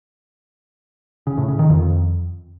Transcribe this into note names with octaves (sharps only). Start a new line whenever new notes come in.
C#3
A2
C#3
D#3
F2